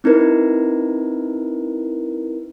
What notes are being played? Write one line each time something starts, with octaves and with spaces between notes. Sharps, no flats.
C4 D#4 E4 A#4 B4